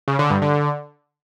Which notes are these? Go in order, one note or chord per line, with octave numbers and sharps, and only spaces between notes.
C#3
D3
G2
D3